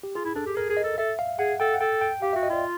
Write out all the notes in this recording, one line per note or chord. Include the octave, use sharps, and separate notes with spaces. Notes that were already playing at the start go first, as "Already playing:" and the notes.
G4
F4 G#4
E4
D4 A4
G4
G#4 A#4
G#4
D#5
A4
A4 E5
F5
G#4 F#5
A4 G5
F#5
A4 G5
G5
G4 F5
E5
F#4
D#5
F4 D5